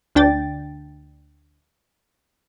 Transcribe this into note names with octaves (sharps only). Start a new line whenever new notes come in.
D2 D4 G5 A6